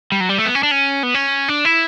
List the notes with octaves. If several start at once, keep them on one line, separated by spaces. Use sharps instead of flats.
G3
F#3
G3
A3
B3
C#4
D4
C#4
B3
C#4
D4
E4